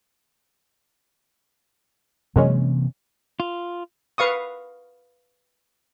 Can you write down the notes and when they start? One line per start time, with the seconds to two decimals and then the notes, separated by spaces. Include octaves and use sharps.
2.36 F#2 C3 E3 G#3 A#3 C#4
3.40 F4
4.18 B4 F5 C#6 D#6